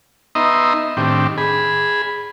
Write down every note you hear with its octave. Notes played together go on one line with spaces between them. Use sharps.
B3 D#4 D#5 E5 A#5 C6
A2 D#3 C4 D4 G4
G#4 B5